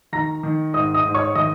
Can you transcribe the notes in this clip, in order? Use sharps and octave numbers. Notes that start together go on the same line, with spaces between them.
D#3 A#5 A#6
D#3
G#2 D#5 D#6
D#5 D#6
G#2
C#5 C#6
D#3 D#5 D#6